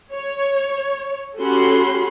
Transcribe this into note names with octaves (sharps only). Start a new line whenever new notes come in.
C#5
C#4 F#4 G4 A4 B5 C6